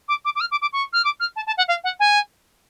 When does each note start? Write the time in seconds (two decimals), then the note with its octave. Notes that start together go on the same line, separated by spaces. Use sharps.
0.08 D6
0.24 D6
0.35 D6
0.40 F6
0.51 D6
0.61 D6
0.72 C#6
0.93 F6
1.04 D6
1.20 F6
1.36 A5
1.46 A5
1.57 F#5
1.68 F5
1.83 F#5
1.99 G#5